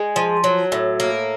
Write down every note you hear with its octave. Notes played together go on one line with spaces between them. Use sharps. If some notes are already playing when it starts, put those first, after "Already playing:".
Already playing: G#3
F3
F#3
A2
A#3